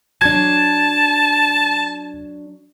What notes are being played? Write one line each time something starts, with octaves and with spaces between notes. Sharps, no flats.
F#3 D4 A5 G#6